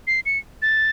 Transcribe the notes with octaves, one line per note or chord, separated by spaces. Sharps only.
C7
C#7
A6